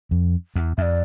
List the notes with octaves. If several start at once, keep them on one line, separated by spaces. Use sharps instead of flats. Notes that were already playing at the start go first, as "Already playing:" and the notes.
F2
E2
F2 D5 E5